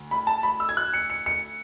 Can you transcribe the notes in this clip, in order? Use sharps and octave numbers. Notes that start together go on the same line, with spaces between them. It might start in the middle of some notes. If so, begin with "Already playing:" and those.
Already playing: D2
B5
A5
B5
E6
G#6
F#6
C#7
C#7
C#7